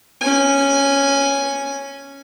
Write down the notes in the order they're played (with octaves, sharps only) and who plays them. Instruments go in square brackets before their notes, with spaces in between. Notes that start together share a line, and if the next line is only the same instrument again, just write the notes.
[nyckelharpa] C#4 G#5